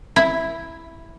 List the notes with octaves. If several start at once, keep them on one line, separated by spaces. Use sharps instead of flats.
E4